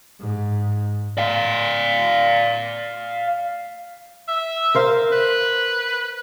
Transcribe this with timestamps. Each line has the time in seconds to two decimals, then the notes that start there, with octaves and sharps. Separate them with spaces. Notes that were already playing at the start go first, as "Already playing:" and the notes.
0.20 G#2
1.18 D5 F5
4.28 E5
4.75 A#4 C5 F5
5.12 B4